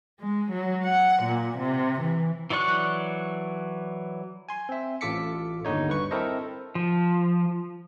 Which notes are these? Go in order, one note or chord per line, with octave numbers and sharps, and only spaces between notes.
G#3
F#3
F#5
A#2
C3
E3
E3 F#3 D5 C#6 F#6
G#5 C6
C4 E5
A1 F4 A4 D6 B6 C#7
G1 D#2 D3 D#4 C#5
G2 B4 C#6
C4 E4 A4 A#4 C5 D#5
F3